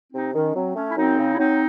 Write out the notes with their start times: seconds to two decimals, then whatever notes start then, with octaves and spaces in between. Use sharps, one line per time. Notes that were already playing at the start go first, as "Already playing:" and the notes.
0.12 C3 C4 D#4
0.34 D#3 C#4
0.55 F#3 C4
0.75 A3 C#4
0.89 E4
0.96 F#2 C4 D#4
1.17 C#3
1.33 E4
1.38 F#3 C4 D#4